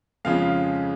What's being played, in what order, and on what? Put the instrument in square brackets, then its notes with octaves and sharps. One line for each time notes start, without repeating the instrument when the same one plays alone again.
[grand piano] F2 C#3 F3 G#3 F5